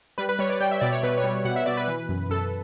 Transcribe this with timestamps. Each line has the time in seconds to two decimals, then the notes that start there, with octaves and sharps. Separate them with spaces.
0.18 G3 B4
0.29 B4
0.39 G3 C#5
0.49 D5
0.60 G3 G5
0.71 E5
0.81 B2 D5
0.92 C#5
1.03 B2 B4
1.18 C#5
1.24 G3
1.45 B2 F#5
1.56 E5
1.66 B2 D5
1.77 B4
1.88 E3
2.09 F#2
2.30 F#2 A4